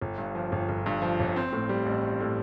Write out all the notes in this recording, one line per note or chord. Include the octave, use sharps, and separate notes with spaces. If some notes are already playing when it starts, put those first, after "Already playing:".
G1
G2
F3
G1
G1
G2
F3
G1
C4
A2
G3
A1
C4
A2